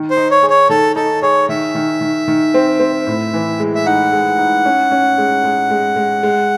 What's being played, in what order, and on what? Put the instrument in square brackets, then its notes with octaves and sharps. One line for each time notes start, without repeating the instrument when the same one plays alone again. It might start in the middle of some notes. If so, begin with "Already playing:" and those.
Already playing: [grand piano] D#3
[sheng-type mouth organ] C5
[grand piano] D#4
[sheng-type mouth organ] C#5
[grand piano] G#4
[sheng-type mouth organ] C#5
[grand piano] D#3 [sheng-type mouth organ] A4
[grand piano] D#4 [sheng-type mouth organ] A4
[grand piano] G#4 [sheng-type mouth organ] C#5
[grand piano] D#3 [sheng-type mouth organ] E5
[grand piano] D#3
D#3
D#3
C4
C4
A2
E3
G#3
[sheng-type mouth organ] E5
[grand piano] D#4 [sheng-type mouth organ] F#5
[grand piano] G#3
D#4
C#4
C#4
G#3
G#3
G#3
G#3
G#3